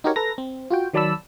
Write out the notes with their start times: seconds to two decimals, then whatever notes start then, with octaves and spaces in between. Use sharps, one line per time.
0.04 D#4 F#4 G4 A#4 C#5
0.16 A4 B4 A#5 A#6
0.38 C4
0.71 F4 F#4 G5
0.93 D#3 F#3 D5 A5 B5 E6